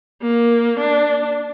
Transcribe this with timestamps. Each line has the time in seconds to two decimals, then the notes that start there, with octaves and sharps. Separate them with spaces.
0.22 A#3
0.80 D4